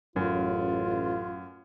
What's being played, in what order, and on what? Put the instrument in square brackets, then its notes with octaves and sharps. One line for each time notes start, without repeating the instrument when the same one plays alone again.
[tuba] A1 [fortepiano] F#2 [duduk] F4